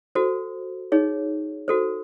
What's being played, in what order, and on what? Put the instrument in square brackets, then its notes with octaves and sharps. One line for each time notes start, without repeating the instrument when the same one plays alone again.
[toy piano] F#4 A4 C5
D#4 G#4 C#5
F#4 A4 C5